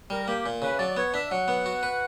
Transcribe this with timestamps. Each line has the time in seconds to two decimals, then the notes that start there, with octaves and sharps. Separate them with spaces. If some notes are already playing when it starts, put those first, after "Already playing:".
0.10 G3 A#4
0.24 A#4
0.28 A#3 G4
0.46 A#2
0.62 C#3 B4
0.75 E5
0.79 F#3 D5
0.90 D5
0.97 B3 C#5
1.14 D4 E5
1.31 F#3 F#5
1.48 B3
1.66 F#4
1.83 B4